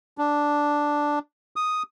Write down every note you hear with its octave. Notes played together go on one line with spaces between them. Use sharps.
D4
D#6